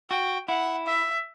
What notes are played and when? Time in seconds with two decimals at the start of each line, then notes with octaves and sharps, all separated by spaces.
0.10 F#4 G5
0.48 E4 F#5
0.86 E5